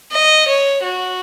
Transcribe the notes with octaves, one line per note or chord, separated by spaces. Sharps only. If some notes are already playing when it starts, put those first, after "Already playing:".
D#5
C#5
F#4